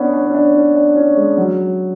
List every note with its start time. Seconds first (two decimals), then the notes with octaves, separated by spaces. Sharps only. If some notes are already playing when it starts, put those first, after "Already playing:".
Already playing: B3 C#4 D4
0.13 D4
0.26 C#4
0.34 D4
0.55 C#4
0.76 D4
0.96 C#4
1.17 G#3
1.38 F#3